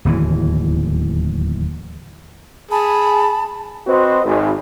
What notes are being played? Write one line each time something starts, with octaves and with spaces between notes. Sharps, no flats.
D1 D#2 E3
G#4 A5 B5
C4 F#4 B4 C5 D#5
G#1